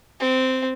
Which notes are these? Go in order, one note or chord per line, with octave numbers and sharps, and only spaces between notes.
C4